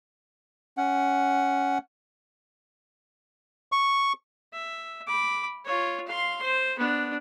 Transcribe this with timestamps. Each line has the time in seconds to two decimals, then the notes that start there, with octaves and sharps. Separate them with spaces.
0.78 C#4 F#5
3.72 C#6
4.53 E5
5.07 B5 D6
5.65 F4 C#5
6.07 F5 C6
6.42 C5
6.79 B3 D4